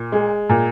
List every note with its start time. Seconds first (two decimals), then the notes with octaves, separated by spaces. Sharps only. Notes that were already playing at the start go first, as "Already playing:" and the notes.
Already playing: A#2
0.12 G#3
0.49 A#2